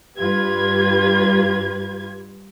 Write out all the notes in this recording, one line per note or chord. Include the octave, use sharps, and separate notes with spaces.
G2 F4 G4 B4 G#6